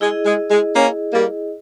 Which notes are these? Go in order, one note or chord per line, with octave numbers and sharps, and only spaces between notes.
G#3 E4 G#4 D#5
G#3
G#3
A#3 C#4
G3 A#3